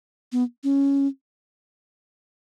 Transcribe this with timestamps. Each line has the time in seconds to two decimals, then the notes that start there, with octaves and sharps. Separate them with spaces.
0.32 B3
0.64 C#4